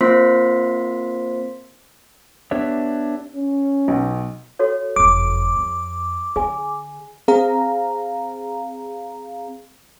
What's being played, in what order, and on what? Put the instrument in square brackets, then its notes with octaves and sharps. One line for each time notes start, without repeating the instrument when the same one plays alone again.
[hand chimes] A#3 C4 F4 C5 C6 B6
[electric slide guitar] B3 D4 G4 B4 C#5 E5
[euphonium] C#4
[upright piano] B1
[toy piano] F#4 A4 C#5
[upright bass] F#1 F2 [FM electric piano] D6
[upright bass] F2
[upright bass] D3 [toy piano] G#4 G#5
[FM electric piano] C4 G#4 F5 A#5